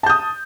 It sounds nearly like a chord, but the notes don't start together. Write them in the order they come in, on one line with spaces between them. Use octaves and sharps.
A5 G6 D#6